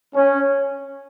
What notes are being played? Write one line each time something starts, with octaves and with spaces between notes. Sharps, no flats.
C#4